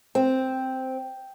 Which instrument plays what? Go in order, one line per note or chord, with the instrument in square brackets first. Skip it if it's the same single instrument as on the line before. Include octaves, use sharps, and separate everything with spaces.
[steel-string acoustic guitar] C4